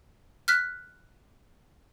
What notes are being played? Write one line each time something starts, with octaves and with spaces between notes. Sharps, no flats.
F6 F#6 B6